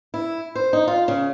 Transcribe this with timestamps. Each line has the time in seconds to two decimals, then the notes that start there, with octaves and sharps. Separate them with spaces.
0.14 E4
0.55 C5
0.73 D#4
0.88 F4
1.08 C#3